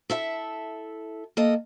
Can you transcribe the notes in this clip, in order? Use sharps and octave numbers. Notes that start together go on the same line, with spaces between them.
E4 A4 E5
A#3 A4 D#5